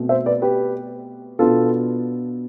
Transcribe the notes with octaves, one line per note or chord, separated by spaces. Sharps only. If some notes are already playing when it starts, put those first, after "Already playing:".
Already playing: B2 A3 C4
C5 E5
B4 D5
G4 B4
B2 B3 D4 F4 A4